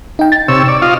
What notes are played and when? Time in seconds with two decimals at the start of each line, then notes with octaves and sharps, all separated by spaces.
0.19 D#4 G5
0.32 A6
0.48 C3 C#5 E6
0.68 D5
0.82 F4 D#5 F5